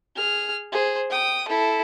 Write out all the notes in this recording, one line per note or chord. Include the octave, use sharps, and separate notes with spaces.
G#4 F6
G#4 C5
G5 D#6
E4 A4